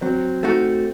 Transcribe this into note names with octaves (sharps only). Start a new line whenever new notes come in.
F#3 C4
A3 D#4 F#4